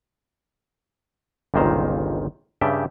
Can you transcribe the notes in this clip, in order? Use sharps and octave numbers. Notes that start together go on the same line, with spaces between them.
G1 C#2 A#2 D#3 C5 A#5
G2 C#3 G4 E5 G5 A5